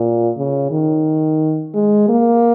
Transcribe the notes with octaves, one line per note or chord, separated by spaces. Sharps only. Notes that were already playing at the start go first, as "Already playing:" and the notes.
Already playing: A#2
C#3
D#3
G#3
A#3